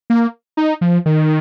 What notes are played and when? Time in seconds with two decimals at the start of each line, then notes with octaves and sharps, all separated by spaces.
0.10 A#3
0.57 D#4
0.81 F3
1.06 D#3